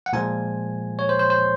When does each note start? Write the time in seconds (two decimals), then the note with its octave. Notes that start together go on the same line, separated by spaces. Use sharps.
0.06 F#5
0.13 A#2 F3 G#3 G#5
0.99 C#5
1.09 C5
1.19 C5
1.30 C5